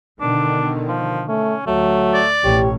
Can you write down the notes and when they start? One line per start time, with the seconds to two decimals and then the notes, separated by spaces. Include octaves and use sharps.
0.21 B2 D3 D#3 D4
0.88 F3
1.29 A3 C#4
1.67 D2 F#3 A3
2.14 D5
2.44 A1 B2 G4 C#5